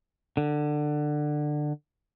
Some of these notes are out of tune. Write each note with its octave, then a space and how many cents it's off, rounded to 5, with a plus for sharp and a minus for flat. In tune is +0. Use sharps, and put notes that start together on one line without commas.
D3 +20